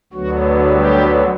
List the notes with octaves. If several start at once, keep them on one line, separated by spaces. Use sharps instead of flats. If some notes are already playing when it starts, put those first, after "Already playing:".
D2 D3 F#3 B3 F#4
G3 G4